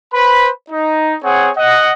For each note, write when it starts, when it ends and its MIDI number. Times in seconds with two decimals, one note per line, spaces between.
0.14 0.50 71
0.14 0.50 72
0.14 0.50 83
0.71 1.16 63
1.24 1.50 60
1.24 1.50 68
1.24 1.50 73
1.24 1.50 78
1.57 1.92 75
1.57 1.92 78